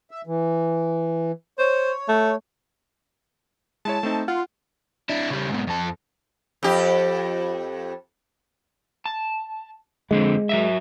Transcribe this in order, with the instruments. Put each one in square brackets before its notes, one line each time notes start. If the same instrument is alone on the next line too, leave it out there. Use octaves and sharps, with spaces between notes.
[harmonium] E5
E3
[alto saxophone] C5 [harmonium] C#5
[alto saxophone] A3
[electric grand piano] G#3 E4 C#5 [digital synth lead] A5
[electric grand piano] A3 C4 D#4
[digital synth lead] F4 [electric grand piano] F#5
[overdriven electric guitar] D4 E4
C#3 G3
G#2 B2
F2 A4
[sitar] F2 G4
[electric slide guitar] A5
[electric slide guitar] F2 D3 C4 [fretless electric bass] G#3
[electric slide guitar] F#3 D#5 E5